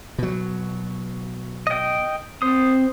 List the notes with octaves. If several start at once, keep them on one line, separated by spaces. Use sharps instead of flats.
B2 F#3
D#5 G5
C4 C5 D#6